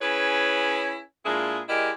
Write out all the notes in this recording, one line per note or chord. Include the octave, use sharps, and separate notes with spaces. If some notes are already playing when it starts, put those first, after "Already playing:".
C#4 E4 G#4 B4 C#5
A#2 G#3 D4 E4 F4 G#4
G#3 E4 G4 A#4 D5 D#5